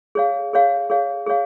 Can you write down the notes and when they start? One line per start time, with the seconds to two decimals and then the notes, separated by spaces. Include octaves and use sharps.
0.15 G#4 C#5 F5
0.53 G#4 C#5 F5
0.90 G#4 C#5 F5
1.27 G#4 C#5 F5